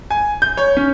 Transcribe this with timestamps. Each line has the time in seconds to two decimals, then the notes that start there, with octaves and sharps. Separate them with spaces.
0.10 G#5
0.42 G6
0.57 C#5
0.77 C#4